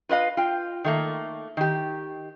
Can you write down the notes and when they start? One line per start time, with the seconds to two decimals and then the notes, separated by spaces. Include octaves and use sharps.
0.09 F4 B4 D#5 F5
0.37 F4 G5
0.84 D#3 A3 A#3
1.57 D#3 G4